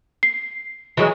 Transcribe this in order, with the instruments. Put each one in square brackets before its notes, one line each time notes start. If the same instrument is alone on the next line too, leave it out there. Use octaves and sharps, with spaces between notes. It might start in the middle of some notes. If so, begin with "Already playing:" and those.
[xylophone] C7
[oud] E3 F#3 G#3